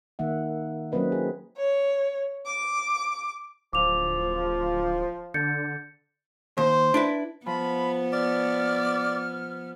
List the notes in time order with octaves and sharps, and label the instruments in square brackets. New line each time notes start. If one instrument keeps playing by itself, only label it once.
[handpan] D#3 A#3 E5 F#5
F#3 A#3 C4 C#4 B4 D#5
G#4
[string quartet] C#5
D6
[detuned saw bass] D1 [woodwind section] F3 [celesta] D6 F7
[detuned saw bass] D3 [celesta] G6 A6 C#7
[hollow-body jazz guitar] D#2 [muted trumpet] C5
[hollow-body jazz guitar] D4 E4 B4
[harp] F3 [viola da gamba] B3 [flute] B5
[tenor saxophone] D5 [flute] F6